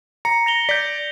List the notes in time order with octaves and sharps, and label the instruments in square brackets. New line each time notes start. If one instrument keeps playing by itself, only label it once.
[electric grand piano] A#5 [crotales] C#7
[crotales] A#6 F7 G7
[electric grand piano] D5 [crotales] G6 B6